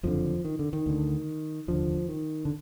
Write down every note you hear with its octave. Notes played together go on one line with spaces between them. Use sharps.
F#1 F2 D3 F3
D#3
D3
D#3
D2 D3
F1 D#2 D3 F3
D#3
D3